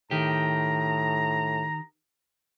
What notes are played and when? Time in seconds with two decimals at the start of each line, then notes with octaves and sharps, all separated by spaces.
0.11 A2 D#3 G4 A#5